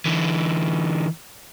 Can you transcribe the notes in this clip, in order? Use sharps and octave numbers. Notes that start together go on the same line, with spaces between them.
D3 E3